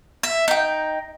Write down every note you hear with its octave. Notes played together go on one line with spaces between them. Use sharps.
E5
D#4 G5